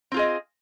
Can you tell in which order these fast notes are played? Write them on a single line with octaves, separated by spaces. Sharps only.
C4 F4 G#4 D#5